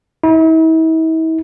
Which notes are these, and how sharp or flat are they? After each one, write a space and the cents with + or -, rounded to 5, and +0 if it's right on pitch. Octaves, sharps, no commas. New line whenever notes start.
E4 -45